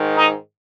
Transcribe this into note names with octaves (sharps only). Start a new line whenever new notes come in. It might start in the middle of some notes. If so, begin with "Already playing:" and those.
Already playing: G#2 D#3
D#4